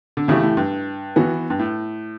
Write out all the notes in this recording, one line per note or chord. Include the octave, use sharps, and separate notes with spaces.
D3
A2 C#3 E3 A3 E4 G4
A2
G2
E3 B3 F#4
G2
A2